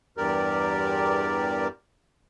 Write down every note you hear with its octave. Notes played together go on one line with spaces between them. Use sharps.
E2 G2 G4 A#4 D5